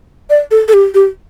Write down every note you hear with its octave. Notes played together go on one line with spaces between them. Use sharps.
D5
A4
A4
G4
G4